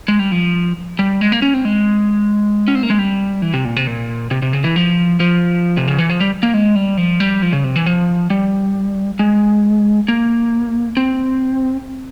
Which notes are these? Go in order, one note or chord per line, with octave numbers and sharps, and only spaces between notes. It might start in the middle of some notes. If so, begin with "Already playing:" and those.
G#3
G3
F3
G3
G#3
A#3
C#4
C4
G#3
C#4
C4
A#3
G#3
G3
E3
C3
A#2
C3
A#2
C3
C3
C#3
E3
F3
F3
C3
C#3
E3
F3
G3
A#3
G#3
G3
F3
G3
F3
C#3
C3
E3
F3
G3
G#3
A#3
C4